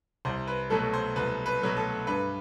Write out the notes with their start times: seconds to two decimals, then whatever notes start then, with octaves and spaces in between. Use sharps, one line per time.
0.25 C2 C5
0.47 B4
0.70 B2 F#3 A3 A4
0.93 C5
1.16 C2 B4
1.46 B4
1.62 B2 F#3 A3
1.77 A4
2.07 G2 B4